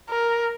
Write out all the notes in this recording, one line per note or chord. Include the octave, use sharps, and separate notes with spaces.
A#4